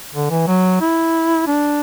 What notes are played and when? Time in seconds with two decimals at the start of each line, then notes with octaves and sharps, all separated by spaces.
0.14 D3
0.30 E3
0.47 F#3
0.81 E4
1.47 D4